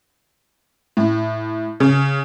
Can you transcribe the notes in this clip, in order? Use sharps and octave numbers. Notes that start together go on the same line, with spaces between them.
A2
C#3